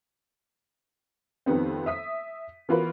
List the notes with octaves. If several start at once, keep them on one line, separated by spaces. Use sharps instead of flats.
F2 D#3 G3 B3 C4
E5 D#6 B6
E3 B3 F4 F#4 A#4 B4